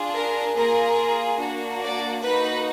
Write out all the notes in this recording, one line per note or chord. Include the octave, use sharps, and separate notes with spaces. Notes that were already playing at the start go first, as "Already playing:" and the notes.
Already playing: D4 F4 G#4
A#4
A#3 F4 G#4 A#4
A#3 D4 F#4
D5
A#3 D#4 F#4 B4